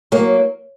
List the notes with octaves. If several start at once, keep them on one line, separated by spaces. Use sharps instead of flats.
F#3 A#3